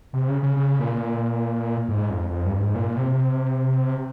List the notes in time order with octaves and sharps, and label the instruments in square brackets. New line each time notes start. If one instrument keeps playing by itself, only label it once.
[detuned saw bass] C3
C#3
C#3
C#3
A#2
G#2
F2
F2
G2
G#2
A#2
C3